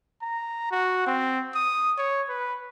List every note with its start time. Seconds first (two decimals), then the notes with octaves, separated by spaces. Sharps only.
0.22 A#5
0.72 F#4
1.07 C4
1.55 D#6
1.98 C#5
2.29 B4